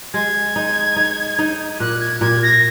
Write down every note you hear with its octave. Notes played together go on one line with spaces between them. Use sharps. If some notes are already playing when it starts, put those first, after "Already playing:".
G#3 G#6
D#4
D#4
D#4
A#2 F#6
G#6
A#2 G#6
A#6